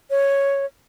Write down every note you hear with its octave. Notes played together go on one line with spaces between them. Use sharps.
C#5